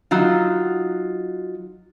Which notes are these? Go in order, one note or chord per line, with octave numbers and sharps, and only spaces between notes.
F#3 D#4 F4